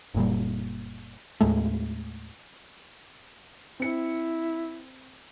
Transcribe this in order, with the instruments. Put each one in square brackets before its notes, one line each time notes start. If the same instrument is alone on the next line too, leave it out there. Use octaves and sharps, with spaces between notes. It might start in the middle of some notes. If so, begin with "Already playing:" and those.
[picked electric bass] F#1 A#2 G3
D#2 A2 G#3 A3
[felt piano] C4 C#7 [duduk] E4